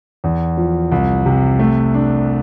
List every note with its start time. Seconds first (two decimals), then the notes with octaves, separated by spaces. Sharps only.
0.24 E2
0.57 F3
0.92 C2
1.26 C3
1.59 A3
1.94 D4